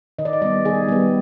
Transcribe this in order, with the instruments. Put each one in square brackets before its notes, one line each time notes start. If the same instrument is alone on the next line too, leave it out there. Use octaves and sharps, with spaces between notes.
[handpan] D#3 D#5
D5
D#5
G3 B3 D5
D#3 G#4
G3 B3